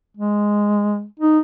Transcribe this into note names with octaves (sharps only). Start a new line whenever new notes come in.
G#3
D#4